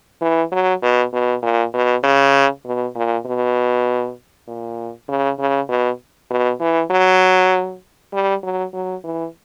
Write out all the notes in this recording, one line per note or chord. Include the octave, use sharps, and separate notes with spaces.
E3
F#3
B2
B2
A#2
B2
C#3
B2
A#2
B2
A#2
C#3
C#3
B2
B2
E3
F#3
G3
F#3
F#3
E3